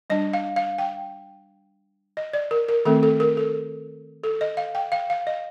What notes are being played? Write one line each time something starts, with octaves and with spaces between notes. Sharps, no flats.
G3 D4 D#5
F5
F5
G5
D#5
D5
A#4
A#4
D#3 A3 C4 A4
A4
A#4
A4
A4
D#5
F5
G5
F5
F5
D#5